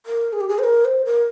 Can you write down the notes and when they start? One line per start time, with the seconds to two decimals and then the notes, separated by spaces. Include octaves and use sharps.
0.06 A#4
0.33 G#4
0.41 G4
0.49 G#4
0.59 C5
0.64 A#4
0.85 C5
1.05 A#4